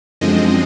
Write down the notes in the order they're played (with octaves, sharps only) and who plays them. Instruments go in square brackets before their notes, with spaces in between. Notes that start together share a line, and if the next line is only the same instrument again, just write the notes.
[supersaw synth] F#2 D3 F3 G#3 C4 D#5